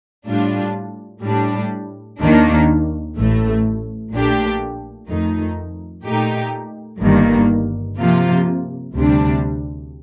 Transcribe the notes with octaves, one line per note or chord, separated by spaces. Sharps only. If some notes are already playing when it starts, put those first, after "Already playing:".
A2 G3 D4 F4
A2 G3 D4
D#2 D#3 A#3 D4
A1 A2 A3
A#1 A#2 A3 D4 G4
F2 D#3 A3 D#4
A#2 A3 D#4 G4
G1 G2 D#3 A#3
C3 F3 A#3 F4
D2 C3 G3 D4